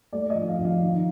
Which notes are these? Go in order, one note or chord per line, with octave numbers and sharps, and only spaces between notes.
A3 D5
D#5
F3
F5
F3
F5
D#3